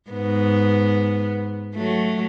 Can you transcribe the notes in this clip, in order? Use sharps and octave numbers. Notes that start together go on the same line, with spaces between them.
G#2 B3
F#3 A3